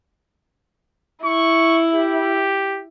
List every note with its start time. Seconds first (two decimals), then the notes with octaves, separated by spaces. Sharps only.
1.25 E4 C#6
1.94 G4